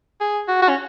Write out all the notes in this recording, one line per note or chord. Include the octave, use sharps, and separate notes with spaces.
G#4
F#4
F#4
C#4